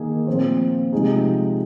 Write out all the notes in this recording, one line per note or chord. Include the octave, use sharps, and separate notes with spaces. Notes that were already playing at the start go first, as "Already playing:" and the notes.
Already playing: D#3 A#3 D#4 G#4
A#2 F3 C4 F4
C3 F3 G#3 D#4 G#4